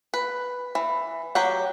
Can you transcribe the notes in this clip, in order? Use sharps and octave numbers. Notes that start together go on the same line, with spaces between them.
B4
E3
F#3 G4 F#5